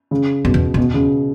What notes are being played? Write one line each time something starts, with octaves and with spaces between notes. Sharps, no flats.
C#3
F#2 B2
E2
E2 B2
C#3